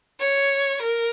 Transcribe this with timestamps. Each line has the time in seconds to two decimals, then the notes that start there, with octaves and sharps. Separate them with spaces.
0.20 C#5
0.82 A#4